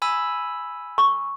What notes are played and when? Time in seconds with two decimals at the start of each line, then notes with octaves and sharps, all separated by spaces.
0.02 G#5 B5 E6
0.98 C#6